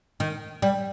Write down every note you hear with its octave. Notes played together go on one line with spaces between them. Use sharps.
D#3
G3